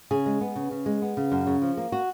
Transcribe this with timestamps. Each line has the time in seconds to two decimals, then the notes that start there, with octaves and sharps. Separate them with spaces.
0.11 C#3 G#4
0.26 G#3
0.41 B3
0.56 C#3
0.71 C#3
0.86 G#3
1.02 B3
1.17 C#3
1.32 F#2
1.47 C#3
1.62 F3
1.77 A#3
1.92 F#4